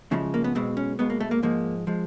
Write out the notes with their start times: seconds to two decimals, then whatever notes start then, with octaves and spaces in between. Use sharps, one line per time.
0.11 F#2 C#3 F3 G#3 A3
0.34 A#3
0.44 B3
0.55 B1 B2 G#3 C4
0.77 C#4
0.99 B1 B2 G#3 B3
1.10 A#3
1.20 A3
1.31 A#3
1.42 G#2 F3 G#3 A#3
1.87 F3 G#3